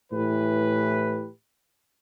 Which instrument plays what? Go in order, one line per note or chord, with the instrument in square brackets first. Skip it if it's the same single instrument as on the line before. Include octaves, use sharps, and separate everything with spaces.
[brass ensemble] A2 E3 G4 B4